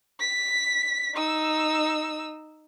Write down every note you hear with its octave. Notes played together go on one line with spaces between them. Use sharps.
B6
D#4 E6